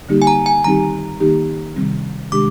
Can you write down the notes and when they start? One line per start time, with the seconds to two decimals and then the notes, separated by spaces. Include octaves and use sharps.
0.09 D3 G3 A#3 D#4 G4
0.22 G#5
0.27 A#5
0.46 G#5
0.64 D#3 G3 C4 D#4 G4 A#5
1.20 D#3 A#3 D#4 G4
1.76 C3 D#3 G3 C4
2.32 C3 D#3 G#3 D4 G4 D6